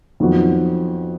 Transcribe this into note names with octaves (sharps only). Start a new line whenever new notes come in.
F2 D#3 F#3 B3 F#4